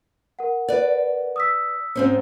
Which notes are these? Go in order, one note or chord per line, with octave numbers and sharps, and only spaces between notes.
A#4 F#5
B4 D5
D#6 E6 B6
G#2 C4 C#4